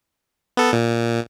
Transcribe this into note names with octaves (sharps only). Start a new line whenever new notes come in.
B3 A4
A#2